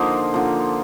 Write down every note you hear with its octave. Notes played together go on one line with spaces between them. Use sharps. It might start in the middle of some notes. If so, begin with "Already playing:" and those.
Already playing: D3 F3 A#3 D#4 F4
D3 F3 A#3